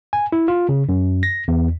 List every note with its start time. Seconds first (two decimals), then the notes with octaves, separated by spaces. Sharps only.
0.13 G#5
0.32 E4
0.48 F4
0.69 C#3
0.89 F#2
1.23 A#6
1.48 E2